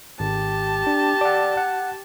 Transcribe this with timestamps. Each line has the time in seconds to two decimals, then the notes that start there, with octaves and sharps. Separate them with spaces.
0.20 G#1 G4 A5
0.87 D4
1.21 D5 F#5
1.57 F#5